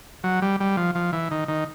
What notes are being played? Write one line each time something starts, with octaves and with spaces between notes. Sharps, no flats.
F#3
G3
G3
F3
F3
E3
D#3
D#3